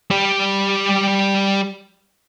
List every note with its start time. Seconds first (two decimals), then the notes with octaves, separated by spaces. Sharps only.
0.11 G3 G4